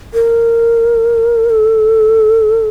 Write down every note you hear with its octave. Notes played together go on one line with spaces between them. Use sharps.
A#4
A4